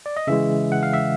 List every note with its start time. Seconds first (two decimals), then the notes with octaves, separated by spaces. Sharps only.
0.06 D5
0.17 D#5
0.27 C#3 E3 G#3 E5
0.72 F#5
0.83 F5
0.93 E5